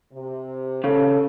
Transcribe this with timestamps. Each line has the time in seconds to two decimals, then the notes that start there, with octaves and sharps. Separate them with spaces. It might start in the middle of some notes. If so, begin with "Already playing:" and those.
0.13 C3
0.84 C#3 A4